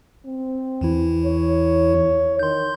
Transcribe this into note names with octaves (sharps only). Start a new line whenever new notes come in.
C4
E2 E3 E4
C#5
D#3 C6 G6